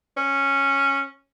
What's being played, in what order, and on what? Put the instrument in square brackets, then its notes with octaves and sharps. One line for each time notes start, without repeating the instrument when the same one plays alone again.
[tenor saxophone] C#4